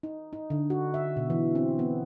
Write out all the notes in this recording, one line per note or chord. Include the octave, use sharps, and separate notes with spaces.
D#4
D#4
D3
F#4
E5
B2
E3
C4
B3